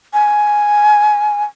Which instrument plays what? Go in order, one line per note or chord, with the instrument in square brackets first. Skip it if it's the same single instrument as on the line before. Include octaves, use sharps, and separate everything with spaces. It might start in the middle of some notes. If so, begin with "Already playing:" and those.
[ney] G#5